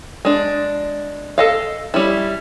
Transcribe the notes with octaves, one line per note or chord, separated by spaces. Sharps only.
G#3 D4
A4 D#5 F5
G3 C#4 E4